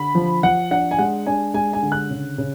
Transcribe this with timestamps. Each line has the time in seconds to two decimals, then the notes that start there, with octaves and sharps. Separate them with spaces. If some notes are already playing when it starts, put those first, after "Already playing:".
Already playing: D3 B5
0.15 F3
0.43 F3 F#5
0.71 D4 F#5
0.91 G#5
0.99 G#3 F#5
1.26 D4 G#5
1.54 G#3 G#5
1.73 G#5
1.82 D3
1.92 F#6
2.10 C#3
2.38 C#3